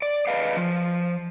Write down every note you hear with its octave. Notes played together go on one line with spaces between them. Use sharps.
D5
B4 D#5 F5
F3